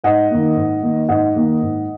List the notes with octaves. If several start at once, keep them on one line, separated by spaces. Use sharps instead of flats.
G#2 D#5 F#5
D#3 A#3
G#2
D#3 A#3
G#2 D#5 F#5
D#3 A#3
G#2